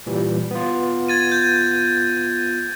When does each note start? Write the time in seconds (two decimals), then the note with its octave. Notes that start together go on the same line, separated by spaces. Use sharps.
0.07 A#2 E3 G3
0.51 B3 F4
1.08 G#6 A6 D#7
1.32 G6